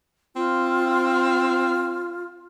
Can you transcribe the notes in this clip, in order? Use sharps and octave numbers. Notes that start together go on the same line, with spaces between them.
C4 F4